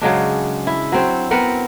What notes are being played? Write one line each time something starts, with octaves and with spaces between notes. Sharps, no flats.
C#3 F#3 G#3 D4
E4
F#3 C4 C5
B3 C4 A#4 F#5